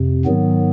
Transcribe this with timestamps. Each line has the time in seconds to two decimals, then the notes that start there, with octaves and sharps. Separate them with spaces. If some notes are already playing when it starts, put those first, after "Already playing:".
Already playing: F2 C3
0.25 G#2 D#3 F#3 B3